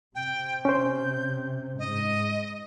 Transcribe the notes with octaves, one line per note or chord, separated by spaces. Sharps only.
C3 G5
C#4 C5 G6
G#2 D#5